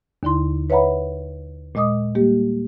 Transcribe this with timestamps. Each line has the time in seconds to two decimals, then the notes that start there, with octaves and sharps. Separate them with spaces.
0.23 D#2 D3 E4 C6
0.70 B4 C#5 E5 F#5 A#5 B5
1.75 A#2 G#3 D#5 D6 D#6
2.15 G3 A#3 G4